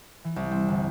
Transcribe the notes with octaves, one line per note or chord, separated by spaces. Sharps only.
E3
C2
C4
G1